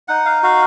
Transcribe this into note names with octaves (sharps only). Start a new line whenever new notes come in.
D#4 F#5
F5
F#4 F5